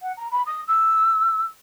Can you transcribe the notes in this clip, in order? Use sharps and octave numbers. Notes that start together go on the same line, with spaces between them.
F#5
A#5
B5
D#6
E6